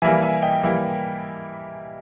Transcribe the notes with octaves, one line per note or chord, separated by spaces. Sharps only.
E3 G3 A#3 E4 E5 G#5
E5 G#5
D#5 G5
E3 G3 A#3 E4